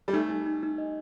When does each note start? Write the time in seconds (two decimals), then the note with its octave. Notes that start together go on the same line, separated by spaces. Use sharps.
0.08 G3
0.13 A3 D#4
0.30 D#4
0.46 D#4
0.63 D#4
0.78 D#5